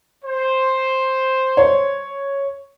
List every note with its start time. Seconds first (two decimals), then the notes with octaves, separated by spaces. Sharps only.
0.25 C5
1.57 C#5